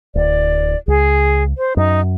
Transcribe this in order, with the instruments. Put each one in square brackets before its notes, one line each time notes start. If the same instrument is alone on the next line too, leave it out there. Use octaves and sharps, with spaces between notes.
[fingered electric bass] D1 [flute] D5
[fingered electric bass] C#2 [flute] G#4
[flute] C5
[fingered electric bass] F#2 [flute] D#4